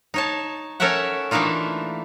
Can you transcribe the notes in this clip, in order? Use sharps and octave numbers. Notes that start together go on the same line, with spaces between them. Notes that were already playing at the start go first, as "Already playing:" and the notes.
D#4 C#5 A5
C#4 A4 A#4 C#5 E5 F#5
E3 A3 A#3 D4 D#4 F4